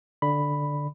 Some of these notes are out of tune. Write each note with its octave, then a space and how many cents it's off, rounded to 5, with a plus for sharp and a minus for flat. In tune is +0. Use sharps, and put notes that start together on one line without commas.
D3 +0 D5 +5 B5 +0